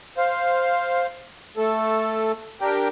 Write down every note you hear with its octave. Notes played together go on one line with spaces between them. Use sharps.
C5 F5
A3 A4
D4 G4 A#4 G5